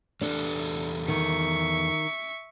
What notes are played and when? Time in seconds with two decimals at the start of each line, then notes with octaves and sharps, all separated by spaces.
0.21 E2 D4 G4 A4
1.08 D#3 E5 C#6